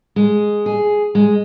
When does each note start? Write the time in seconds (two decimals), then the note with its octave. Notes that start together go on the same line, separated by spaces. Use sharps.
0.16 G#3
0.66 G#4
1.15 G#3